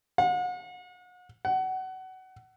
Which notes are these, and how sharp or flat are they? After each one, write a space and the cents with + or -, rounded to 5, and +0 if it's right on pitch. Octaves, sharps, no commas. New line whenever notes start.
F#5 -40
F#5 +25